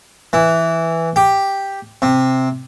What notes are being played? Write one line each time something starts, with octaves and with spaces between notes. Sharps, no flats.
E3
G4
C3